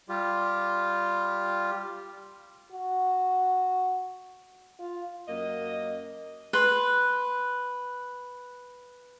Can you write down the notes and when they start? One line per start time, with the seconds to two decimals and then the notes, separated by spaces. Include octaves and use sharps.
0.09 G3 F4 G4
2.72 F#4
4.80 F4
5.28 F#2 A#3 D#5
6.53 B4 C6